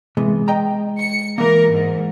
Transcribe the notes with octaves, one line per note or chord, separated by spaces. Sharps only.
C3 E3 G#3 B3
D#5 G5 A#5
C#7
E3 A#3 A#4
G#2